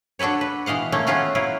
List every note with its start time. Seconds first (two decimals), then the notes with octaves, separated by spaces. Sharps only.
0.19 D4 F#4 A4 B4 C#5
0.41 B4
0.66 B2 E3 D#5 F5 F#5
0.92 A3 A#3 C#4
1.07 A3 B3 C#4 F4 F#4
1.35 F#3 E4 F4